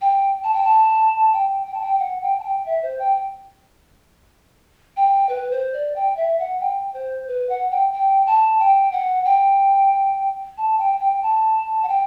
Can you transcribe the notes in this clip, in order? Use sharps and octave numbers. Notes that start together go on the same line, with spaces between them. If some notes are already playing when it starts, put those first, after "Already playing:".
G5
A5
G5
A5
G5
G5
A5
G5
F#5
G5
A5
G5
E5
C5
G5
G5
B4
C5
D5
G5
E5
F#5
G5
C5
B4
F#5
G5
G5
A5
G5
F#5
G5
A5
G5
G5
A5
F#5
G5